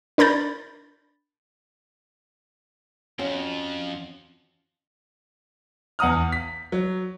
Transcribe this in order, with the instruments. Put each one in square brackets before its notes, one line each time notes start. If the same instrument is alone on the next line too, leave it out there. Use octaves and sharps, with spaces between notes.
[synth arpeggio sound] D4 A#4 B5 G6 A6
[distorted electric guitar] F2 [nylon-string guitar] C#4 F#4 F5
[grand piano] E2 F#5 A#5 D#6 F6
B6
F#3